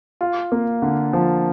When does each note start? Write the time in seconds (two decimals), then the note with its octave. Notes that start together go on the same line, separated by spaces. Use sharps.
0.21 F4
0.52 A#3
0.82 D3
1.13 F3